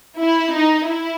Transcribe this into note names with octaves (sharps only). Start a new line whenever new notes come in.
E4
D#4
E4